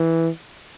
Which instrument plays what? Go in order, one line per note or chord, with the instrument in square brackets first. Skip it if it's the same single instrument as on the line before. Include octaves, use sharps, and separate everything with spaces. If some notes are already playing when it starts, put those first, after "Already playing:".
Already playing: [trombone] E3